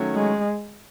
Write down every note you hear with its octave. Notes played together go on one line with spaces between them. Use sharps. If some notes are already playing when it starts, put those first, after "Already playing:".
Already playing: D#3 F#3 A3 C#4
G#3